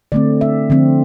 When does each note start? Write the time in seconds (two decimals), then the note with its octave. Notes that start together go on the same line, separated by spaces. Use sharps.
0.12 D3 A3 C4 D5
0.41 E5
0.70 D3 F3 C4